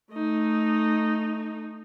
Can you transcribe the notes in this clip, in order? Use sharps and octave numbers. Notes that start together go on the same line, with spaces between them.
A3 D#4